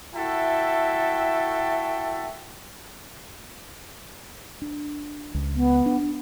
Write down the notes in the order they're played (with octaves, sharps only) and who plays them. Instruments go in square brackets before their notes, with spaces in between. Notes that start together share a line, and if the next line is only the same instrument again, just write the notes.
[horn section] E4 F#4 A4 E5 G5 A5
[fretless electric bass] D4
C#2
[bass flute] B3
[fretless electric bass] D4